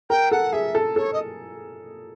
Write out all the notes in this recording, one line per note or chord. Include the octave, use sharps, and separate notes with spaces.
A#4 G5
A4 F#5
G#4 E5
A4
A4 C#5
D#5